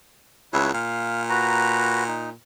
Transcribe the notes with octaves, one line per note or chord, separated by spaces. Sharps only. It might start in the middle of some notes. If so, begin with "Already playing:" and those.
C#2 E4 B4 C#5
A#2 F5
F#4 B4 A#5
D#4